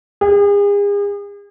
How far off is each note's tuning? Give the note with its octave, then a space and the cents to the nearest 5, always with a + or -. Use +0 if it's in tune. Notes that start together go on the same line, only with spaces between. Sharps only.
G#4 -40